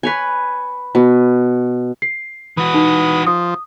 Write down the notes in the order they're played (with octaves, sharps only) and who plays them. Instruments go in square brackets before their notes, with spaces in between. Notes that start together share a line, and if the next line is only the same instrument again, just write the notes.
[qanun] B4 C#5 G#5
B2
[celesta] C7
[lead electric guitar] E3 F#4 [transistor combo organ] B4 D#6
[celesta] D#4
[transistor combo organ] F3 [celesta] D#6